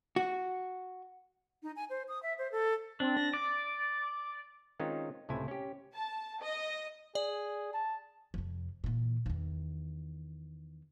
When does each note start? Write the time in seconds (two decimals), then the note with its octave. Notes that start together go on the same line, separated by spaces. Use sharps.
0.16 F#4
1.63 D#4
1.76 G#5
1.90 C5
2.08 D#6
2.23 E5
2.39 C5
2.52 A4
3.00 C4 D4
3.17 A#6
3.34 D5 D6
4.80 D#3 G#3 C4 C#4 D#4 F4
5.29 C#2 A2 C3 E4 G#5
5.48 C#4 G4
5.93 A5
6.40 D#5
7.15 G#4 D5
7.74 A5
8.34 F2 C3
8.84 A#2 E3
9.26 E2 D#3